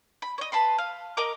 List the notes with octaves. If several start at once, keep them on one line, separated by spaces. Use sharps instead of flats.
B5
C#5 D#5
B4 A5 B5 C6
F5
A#4 D#5 A#5 D6